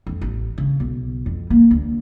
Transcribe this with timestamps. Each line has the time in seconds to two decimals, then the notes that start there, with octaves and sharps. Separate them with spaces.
0.07 F2
0.21 A1
0.58 C#3
0.80 B1
1.26 F2
1.50 A#3
1.71 D2